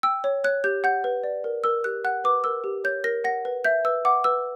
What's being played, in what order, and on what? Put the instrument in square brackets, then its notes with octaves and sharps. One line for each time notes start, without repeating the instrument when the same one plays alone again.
[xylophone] G5 E6
C#5
C#5 F#6
G4 G6
F#5 G6
B4
D5
A#4
A#4 E6
G4 F#6
F#5 F#6
B4 D6
A#4 E6
G4
C#5 G6
A#4 A#6
F#5 A#6
B4
E5 G6
B4 E6
F#5 D6
B4 E6